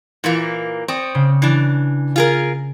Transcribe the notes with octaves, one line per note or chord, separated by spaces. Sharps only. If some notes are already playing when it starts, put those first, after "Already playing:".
A#2 E3 A#3
C4 D5 C#6 D#6
C#3
E3 D4
F4 G#4 A#4